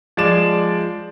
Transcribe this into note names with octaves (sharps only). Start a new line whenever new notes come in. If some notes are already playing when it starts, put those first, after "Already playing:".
F3 G#3 D5 E7